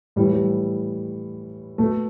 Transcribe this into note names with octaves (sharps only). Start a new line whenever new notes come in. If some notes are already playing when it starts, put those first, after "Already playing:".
A2 E3 G3
G3
B2 A3